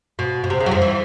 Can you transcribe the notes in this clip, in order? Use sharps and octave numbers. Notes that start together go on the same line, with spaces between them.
B2
B2
C3
C#3
F#3
F2 F3
E3